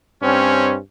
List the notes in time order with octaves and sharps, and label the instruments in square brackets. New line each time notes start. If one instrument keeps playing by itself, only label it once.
[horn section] G2 C4 C#4